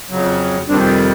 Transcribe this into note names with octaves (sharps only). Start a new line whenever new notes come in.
F2 C#3 F#3
F2 C3 D#3 G3 C4 D4